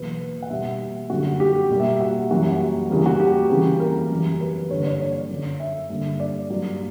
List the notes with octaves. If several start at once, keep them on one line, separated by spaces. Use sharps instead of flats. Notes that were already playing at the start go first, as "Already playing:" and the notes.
Already playing: E2 B2 F#3 A#3 B4
F#5
B2 G3 A#3 E5
F#2 D3 G3 A#3 F#4
G4
B2 G3 A#3
E5
F#4
F#2 E3 G3 A#3 F#4
E2 C#3 E3 G3 A#3
F#4
G4
E2 C#3 E3 G3 A#3
A#4
F#2 E3 G3
B4
G2 D3 A#3 C#5
C#5
D5
C#5
F#2 D3 F#3
E5
G2 D3 G3 A#3
D5
G2 F#3 A#3